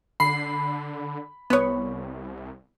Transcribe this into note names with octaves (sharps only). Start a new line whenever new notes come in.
D3 B5 C7
C2 B3 B4 C#5